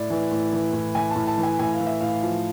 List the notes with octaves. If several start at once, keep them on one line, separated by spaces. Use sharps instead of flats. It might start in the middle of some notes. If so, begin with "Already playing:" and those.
Already playing: A2 D5
E3
A2
E3
A2
E3 G#5
A5
A2
A5
E3
G#5
A2 G#5
F5
E3
E5
A2 F5
F3